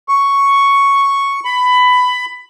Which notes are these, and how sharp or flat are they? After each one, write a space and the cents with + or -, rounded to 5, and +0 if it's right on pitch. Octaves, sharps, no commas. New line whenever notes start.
C#6 +0
B5 +15